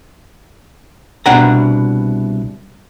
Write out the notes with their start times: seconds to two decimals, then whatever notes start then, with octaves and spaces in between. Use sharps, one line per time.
1.26 C2 B2 D4 F#5 A#5